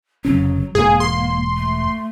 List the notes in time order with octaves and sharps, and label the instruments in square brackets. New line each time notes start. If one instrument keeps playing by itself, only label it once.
[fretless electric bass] F1 C#3 C#4 [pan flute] F#3
[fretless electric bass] E1 G#2 [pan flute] A#3 [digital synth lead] G#4
[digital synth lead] C6
[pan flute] A3